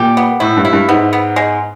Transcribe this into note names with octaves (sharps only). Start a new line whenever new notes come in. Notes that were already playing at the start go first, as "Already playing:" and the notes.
Already playing: A#2 G4
B3
A2 E4
G2
E4
G2
G#2 B3
B3
G#3